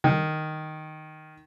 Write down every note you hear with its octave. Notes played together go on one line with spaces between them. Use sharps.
D#3